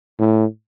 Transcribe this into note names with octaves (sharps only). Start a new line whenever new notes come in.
A2